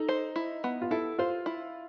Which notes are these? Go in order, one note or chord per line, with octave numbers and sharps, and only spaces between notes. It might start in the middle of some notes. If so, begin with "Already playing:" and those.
Already playing: D#4 A4
C5
E4
B3
F4
E4 A4
F4 C5
E4